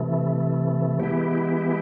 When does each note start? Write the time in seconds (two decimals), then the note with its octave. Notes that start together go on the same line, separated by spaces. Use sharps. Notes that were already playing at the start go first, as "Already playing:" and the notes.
Already playing: C3 E3 A3
1.00 E3 G#3 B3 E4 G4